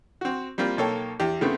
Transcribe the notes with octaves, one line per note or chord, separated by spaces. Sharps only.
C4 F#4
G3 A#3 C4 F4
B1 A#3 A4 C#5 G5
E2 G4
C#3 A3 B3 C4